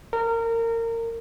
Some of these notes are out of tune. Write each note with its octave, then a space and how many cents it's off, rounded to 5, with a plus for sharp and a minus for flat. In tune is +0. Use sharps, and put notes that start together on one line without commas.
A#4 -25